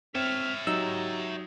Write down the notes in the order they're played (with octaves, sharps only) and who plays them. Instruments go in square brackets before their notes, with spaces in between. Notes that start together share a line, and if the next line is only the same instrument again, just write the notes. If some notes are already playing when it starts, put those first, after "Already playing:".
[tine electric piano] C4 [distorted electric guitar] C#5 E5 [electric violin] F6 B6
[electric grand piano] F#3 D#4 [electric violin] G4 [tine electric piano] E6